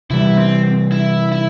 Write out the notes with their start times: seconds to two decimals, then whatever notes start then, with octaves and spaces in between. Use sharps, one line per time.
0.10 C3 E3 G3 E4
0.37 C4
0.92 E4
1.32 E4